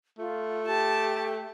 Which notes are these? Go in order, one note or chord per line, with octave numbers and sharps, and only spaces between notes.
A3 F4
G4 A5